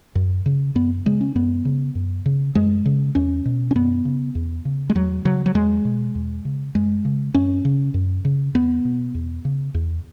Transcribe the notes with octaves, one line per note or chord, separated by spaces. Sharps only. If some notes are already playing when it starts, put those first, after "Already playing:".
F#2
C#3
F#2 B3
C#3 G#3
C#4
F#2 B3
C#3
F#2
C#3
F#2 G#3
C#3
E2 C#4
B2
C#4
F#2 B3
C#3
E2
C#3
G#3
E2 F#3
C#3 F#3
F#3
E2 G#3
B2
E2
C#3
F#2 G#3
C#3
F#2 C#4
C#3
F#2
C#3
E2 B3
B2
E2
C#3
E2